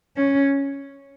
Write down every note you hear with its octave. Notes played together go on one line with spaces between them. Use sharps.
C#4